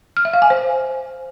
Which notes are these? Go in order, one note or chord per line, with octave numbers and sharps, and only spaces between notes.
F6
E5
F5
G#5
C5